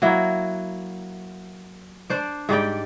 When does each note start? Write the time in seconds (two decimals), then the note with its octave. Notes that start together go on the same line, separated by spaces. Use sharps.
0.02 F#3 A#3 E4
2.10 D4 C5 D5
2.49 G#2 G3 D5 G5